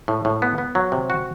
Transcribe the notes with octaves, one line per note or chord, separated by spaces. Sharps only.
A2
A2
B3
B3
F#3
C3
F#4